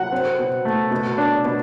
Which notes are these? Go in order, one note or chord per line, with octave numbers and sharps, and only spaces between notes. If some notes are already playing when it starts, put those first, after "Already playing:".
Already playing: F#3 F#5
C4
B2
A3
B2
D4
B2